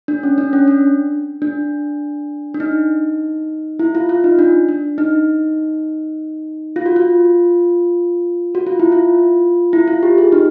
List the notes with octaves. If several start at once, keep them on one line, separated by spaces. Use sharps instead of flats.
D4
C#4
D4
C#4
D4
D4
D4
D#4
E4
F4
F4
D#4
D4
D4
D#4
F4
F#4
F4
F#4
F4
E4
F4
E4
F4
G4
G#4
D#4